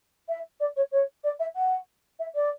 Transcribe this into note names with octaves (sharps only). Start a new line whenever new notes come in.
E5
D5
C#5
C#5
D5
E5
F#5
E5
D5